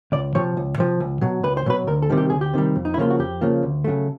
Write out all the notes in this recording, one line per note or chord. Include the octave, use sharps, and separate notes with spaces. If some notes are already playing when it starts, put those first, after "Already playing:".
C#2 D5
C3 F3 C#5
C#2
C3 F3
C#2
B2 F#3
C#2 B4
C5
B2 F#3 B4
D2 A#4
A4
C3 D#3 G3
G4
D2 G#4
G4
C3 D#3 G3
F2
D#4
E4
C#3 F3 A#3 F4
F#4
F2 G4
C#3 F3 A#3
D2
C#3 F#3 A3